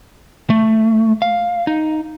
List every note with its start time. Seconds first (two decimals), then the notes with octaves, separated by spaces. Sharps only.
0.50 A3
1.22 F5
1.67 D#4